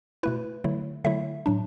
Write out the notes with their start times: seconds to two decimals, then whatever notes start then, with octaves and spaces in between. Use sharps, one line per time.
0.23 B2 A3 E4 B4
0.64 D3 F#3 A3 E4
1.04 D3 F#3 A3 E4 E5
1.46 A2 F#3 D4